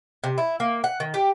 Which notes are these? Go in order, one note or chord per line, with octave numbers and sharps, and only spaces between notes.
C3
E4
A#3
F#5
D#3
G4